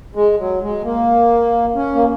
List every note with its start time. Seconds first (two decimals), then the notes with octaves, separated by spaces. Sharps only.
0.15 G#3
0.39 F#3
0.61 G#3
0.84 A#3
1.75 C#4
1.95 A#3